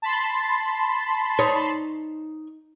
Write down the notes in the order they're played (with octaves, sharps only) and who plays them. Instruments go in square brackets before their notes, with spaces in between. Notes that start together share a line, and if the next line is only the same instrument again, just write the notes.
[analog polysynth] A5 B5 C6
[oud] D#4 C#5